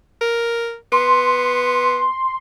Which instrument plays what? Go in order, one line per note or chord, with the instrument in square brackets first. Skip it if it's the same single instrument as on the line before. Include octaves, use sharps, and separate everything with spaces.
[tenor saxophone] A#4
[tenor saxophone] B3 [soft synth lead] C6